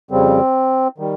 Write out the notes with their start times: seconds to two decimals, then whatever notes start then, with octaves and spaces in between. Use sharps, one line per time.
0.11 F2 C#3 G3 C4
0.98 D#3 G3